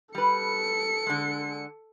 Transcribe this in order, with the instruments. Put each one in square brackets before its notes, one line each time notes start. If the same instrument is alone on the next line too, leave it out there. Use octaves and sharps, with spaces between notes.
[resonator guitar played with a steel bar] G3 B4 [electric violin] A4 C#7
[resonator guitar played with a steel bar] D3 G#3